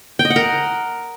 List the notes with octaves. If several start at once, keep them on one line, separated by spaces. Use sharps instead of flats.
G5
D#5
F#5
A#4